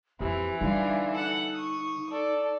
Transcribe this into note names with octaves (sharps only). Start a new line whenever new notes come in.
F2 E3 C4 G4
D3 G3 D4 D#4 F4
A4 F#5
C#6 D#6
A4 D5